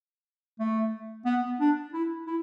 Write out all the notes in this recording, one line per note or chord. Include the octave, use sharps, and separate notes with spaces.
A3
B3
D4
E4
E4